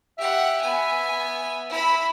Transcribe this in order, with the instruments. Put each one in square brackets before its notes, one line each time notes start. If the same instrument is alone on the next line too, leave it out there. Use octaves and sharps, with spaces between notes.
[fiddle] G4 F#5 [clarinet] E5
[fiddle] B3 G#5
E4 B5